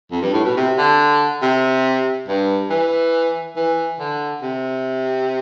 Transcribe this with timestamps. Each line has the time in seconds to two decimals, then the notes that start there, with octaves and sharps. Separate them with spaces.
0.11 F2
0.21 G2
0.33 A2
0.44 B2
0.56 C3
0.78 D3
1.42 C3
2.28 G2
2.70 E3
3.56 E3
3.99 D3
4.42 C3